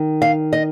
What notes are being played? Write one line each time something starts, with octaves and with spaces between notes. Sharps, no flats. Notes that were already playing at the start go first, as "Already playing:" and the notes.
Already playing: D#3
F5
D#5